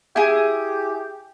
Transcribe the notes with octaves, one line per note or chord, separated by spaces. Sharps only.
E4 G4 G#4